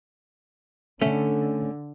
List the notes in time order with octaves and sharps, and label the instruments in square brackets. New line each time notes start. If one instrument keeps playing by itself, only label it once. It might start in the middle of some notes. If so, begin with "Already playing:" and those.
[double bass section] D3 [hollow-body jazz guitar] A3 C#4